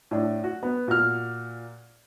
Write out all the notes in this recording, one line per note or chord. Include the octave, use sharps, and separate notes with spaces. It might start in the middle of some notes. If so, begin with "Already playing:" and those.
A2 D4
F#4
B3
A#2 F#4 F6